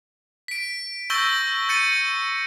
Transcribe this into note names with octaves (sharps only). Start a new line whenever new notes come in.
B6 D7
C#6 E6 G6 A6 A#6 G7
G6 A6 C#7 D#7